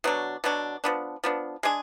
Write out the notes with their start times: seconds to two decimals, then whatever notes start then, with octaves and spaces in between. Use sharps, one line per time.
0.04 B2 F#3 D4
0.44 B2 F#3 D4
0.84 F3 B3 D4
1.24 F3 B3 D4
1.63 G#3 D4 G#4